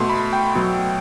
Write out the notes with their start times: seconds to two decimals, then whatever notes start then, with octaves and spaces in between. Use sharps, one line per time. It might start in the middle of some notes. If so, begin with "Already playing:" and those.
Already playing: B2 A3 C6
0.10 B5
0.33 G5
0.55 B2 F#3 A3